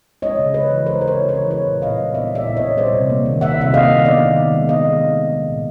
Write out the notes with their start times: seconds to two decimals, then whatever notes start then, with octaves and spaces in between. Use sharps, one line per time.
0.22 G#3 C#5 D#5
0.39 C#3
0.54 C#3 B4 C#5
0.71 E3
0.86 G#3 A#4 C5
1.01 C#3 C5
1.07 B4 C#5
1.19 C#3
1.29 B4 C#5
1.34 E3
1.50 B3 B4 C#5
1.67 A#2
1.82 A#2 D#5 F5
1.98 G3
2.14 B3 D5 E5
2.31 A#2 D5 E5
2.46 A#2
2.57 C#5 D#5
2.62 G3
2.78 G3 C5 D5
2.93 C3
3.10 A#3
3.26 D#3
3.41 G3 E5 F#5
3.58 C3 E5
3.74 A#3 D#5 F5
3.89 D#3
4.05 B3 D5 E5
4.22 D#3
4.38 D#3
4.53 G#3
4.69 B3 D#5 F5
4.85 D#3
5.01 D#3
5.17 G#3
5.33 G#3
5.49 A#2